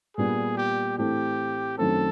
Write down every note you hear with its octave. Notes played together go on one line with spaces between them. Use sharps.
A#2 G3 B3 G#4
G4
A2 E3 A3 C4 G4
F#2 D#3 F#3 A3 C4 A4